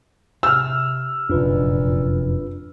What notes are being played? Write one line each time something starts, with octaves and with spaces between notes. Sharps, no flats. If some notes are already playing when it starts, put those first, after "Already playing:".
C3 E6 F6
F1 F#2 A#2 D4 F4 B4